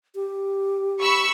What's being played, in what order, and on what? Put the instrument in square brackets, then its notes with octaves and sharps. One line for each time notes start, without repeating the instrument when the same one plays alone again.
[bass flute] G4
[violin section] B5 C#6 E6